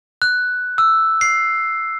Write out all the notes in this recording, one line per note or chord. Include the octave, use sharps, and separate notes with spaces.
F#6
E6
C7